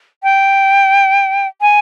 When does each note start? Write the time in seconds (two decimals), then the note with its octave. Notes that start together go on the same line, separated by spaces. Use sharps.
0.23 G5
1.61 G#5